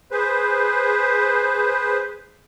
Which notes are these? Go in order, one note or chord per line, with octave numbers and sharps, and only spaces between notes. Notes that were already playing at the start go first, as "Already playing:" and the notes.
G#4 B4 C5